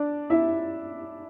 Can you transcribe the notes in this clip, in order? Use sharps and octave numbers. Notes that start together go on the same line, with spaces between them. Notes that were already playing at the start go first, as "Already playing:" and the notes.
Already playing: D4 D5
E4 E5